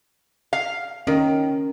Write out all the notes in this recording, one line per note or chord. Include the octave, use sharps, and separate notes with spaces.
F5
D#3 C#4 A#4